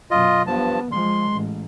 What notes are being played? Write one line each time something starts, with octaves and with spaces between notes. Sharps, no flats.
F#2 B2 F4 D#5
G2 F3 B3 A5
F3 G#3 C6
A1